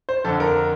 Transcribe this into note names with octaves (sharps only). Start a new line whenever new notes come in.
C5
F2 D3 A4
A#4